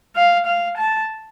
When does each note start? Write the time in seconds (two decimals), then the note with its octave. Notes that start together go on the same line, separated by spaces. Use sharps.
0.16 F5
0.46 F5
0.77 A5